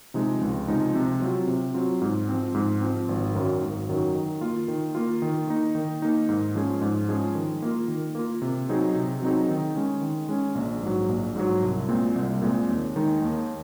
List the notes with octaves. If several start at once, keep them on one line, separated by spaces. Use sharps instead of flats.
C3 F3 G#3 D#4
C#2
C3 F3 G#3 D#4
C3
F#3 C4 F4
C3
F#3 C4 F4
G#2
F3 C4
G#2
F3 C4
G#1
F#2 D#3 F#3
G#1
F#2 D#3 F#3
D#3
A#3 F4
D#3
A#3 F4
D#3
A#3 D#4
D#3
A#3 D#4
G#2
F3 G#3 C#4 G#4
G#2
F3 G#3 C#4 G#4
D#3
A#3 F4
D#3
A#3 F4
C3
F#3 C4 D#4 G#4
C3
F#3 C4 D#4 G#4
D#3
G#3 C#4
D#3
G#3 C#4
A#1
G#2 F#3
A#1
G#2 F#3
C2
A#2 G#3 C4
C2
A#2 G#3 C4
D#2
D#3 G#3 D#4
D#2